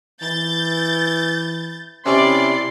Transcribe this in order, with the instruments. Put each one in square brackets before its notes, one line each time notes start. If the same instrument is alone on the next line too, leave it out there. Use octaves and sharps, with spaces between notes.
[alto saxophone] E3 [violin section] G6 A6
[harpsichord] C3 C#6 [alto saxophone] C#4 [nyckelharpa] E4 C6 [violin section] D5